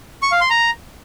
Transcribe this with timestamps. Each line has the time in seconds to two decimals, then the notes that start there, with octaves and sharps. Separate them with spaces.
0.22 C#6
0.32 F5
0.41 C6
0.50 A#5